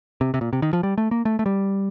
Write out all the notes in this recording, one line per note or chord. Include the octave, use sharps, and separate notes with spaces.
C3
C3
A#2
C3
D#3
F3
G3
A3
A#3
A3
A3
G3